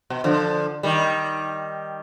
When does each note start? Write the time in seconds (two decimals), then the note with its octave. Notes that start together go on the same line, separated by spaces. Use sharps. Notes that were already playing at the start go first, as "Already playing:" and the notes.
0.10 B2
0.24 D3 F3
0.83 D#3 G3